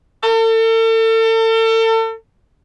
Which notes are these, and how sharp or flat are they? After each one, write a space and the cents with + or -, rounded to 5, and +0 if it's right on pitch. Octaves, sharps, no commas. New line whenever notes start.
A4 +40